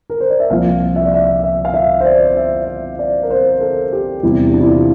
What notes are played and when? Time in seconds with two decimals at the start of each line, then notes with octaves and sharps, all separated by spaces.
0.10 A#4
0.20 C5
0.30 D5
0.40 E5
0.50 C2 A#2 F3 F5
0.96 E5
1.05 D5
1.14 E5
1.44 E5
1.65 F5
1.74 E5
2.00 C5
2.06 D5
2.37 E5
2.68 E5
2.99 D5
3.23 A#4
3.30 C5
3.61 A4
3.92 G4
4.23 E2 C3 G3 E4
4.52 D4
4.61 E4
4.69 F4